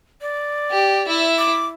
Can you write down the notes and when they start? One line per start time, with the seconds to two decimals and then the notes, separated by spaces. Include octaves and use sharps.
0.21 D5
0.71 G4
1.06 E4 E5
1.38 D6